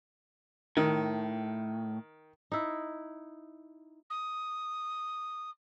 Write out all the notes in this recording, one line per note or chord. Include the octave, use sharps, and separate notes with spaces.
A2 D#3
D#4 E4
D#6